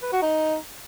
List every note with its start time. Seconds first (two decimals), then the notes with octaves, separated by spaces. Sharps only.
0.02 B4
0.12 F#4
0.22 D#4